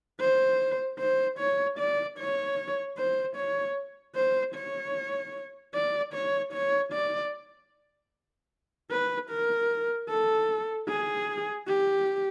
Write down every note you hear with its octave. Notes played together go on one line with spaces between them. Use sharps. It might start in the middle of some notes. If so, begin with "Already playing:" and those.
C5
C5
C#5
D5
C#5
C5
C#5
C5
C#5
D5
C#5
C#5
D5
B4
A#4
A4
G#4
G4